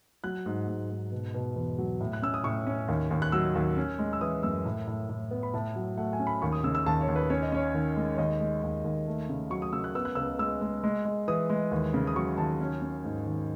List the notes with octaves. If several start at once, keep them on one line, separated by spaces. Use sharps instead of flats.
F#3 F#6
G#2
G#2
G#2
B2
B2
E2
F#3
A2
F#6
C#4 E6
D#6
A2 C#6
C#4
D#2
D#2
F#6
F#3 E6
D#2
C#4
G#3
E6
E3 D#6
F#2 E6
A2
A2
A2
B3
B5
A2 A5
F#3
A3 F#5
G#5
C#4
B5
D#2 C#6
D#6
C#3 E6
E6
D#2 A5
C#5
D#2
B4
C#4 C#5
D#5
C#4 C#5
D#3
G#3
C#5
D#2 D#5
G#3
D#2
D#2
A3
C#3
F#3 C#6
D#6
C#3 E6
F#6
B3 E6
F#6
C#2 E6
G#3 E6
G#3
G#3
G#3
E3 D#6
G#3
D#2
C#3
D#6
F#3 C#6
D#2 A5
C#4
C#4
G#2
D#3